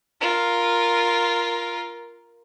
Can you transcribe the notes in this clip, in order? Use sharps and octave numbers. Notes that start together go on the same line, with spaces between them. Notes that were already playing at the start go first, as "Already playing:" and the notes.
F4 A#4